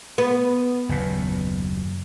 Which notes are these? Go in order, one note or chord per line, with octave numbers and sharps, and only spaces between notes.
B3
F#1 D#2 A#2